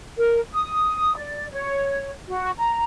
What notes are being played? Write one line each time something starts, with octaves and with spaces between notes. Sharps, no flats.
A#4
D#6
D5
C#5
F#4
A#5